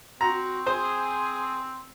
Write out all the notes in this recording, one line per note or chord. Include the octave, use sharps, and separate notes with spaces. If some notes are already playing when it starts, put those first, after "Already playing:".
C4 F#4 A#5
G#4 C5